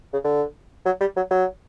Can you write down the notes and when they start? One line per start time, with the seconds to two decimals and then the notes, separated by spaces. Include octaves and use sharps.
0.13 C#3
0.24 D3
0.85 F#3
1.00 G3
1.16 F#3
1.31 F#3